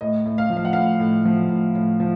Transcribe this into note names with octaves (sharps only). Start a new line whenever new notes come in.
A2 D#5
A2
F5
F3
F5
F#5
A2 F5
A2
F3
A2
A2
F3